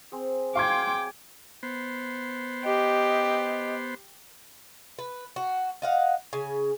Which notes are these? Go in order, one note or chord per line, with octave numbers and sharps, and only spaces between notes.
C4 G#4
F#3 F5 G5 C6 D6 G#6
B3 C5
G4 D#5
B4
F#4
D#5 F5 F#5
C#3 G#5